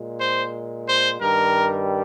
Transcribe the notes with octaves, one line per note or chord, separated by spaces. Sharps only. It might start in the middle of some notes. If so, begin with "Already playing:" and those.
Already playing: A#2 G#3
C5
C5
G2 D#3 G3 A#4